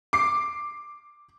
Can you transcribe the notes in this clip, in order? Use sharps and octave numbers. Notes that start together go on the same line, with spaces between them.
D6 C7